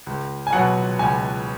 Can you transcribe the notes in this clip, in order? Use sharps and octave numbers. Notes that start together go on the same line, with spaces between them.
C#2
G#5
B2 F#3 F#5
C#2 G#5